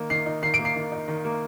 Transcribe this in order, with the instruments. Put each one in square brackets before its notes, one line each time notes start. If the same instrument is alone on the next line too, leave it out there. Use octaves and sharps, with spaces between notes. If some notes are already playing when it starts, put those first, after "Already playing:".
Already playing: [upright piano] D#3 A#3
D#3 C7
D#4
D#3 C7
D7
A#3
C7
D#3
D#4
D#3
A#3